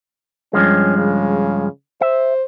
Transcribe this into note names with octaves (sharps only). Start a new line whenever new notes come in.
G2 F3 G#3 C#4
C#3
C5 E5